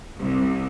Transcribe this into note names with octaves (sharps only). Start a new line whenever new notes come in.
C2